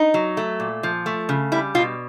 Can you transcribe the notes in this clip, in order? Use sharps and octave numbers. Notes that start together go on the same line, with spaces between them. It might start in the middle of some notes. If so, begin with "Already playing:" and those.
Already playing: D#4
F#3
A3
A#2
F3
A3
C#3
G3 E4
B2 F4